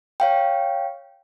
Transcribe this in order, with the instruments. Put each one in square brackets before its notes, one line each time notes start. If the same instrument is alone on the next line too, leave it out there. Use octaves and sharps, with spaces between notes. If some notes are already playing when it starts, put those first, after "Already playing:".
[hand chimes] C#5 F5 G5